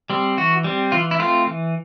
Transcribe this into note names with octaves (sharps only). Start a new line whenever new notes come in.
G3 C4
E3 F#4
G3 C4
E3 F4
E4
A3 C4 F4
E3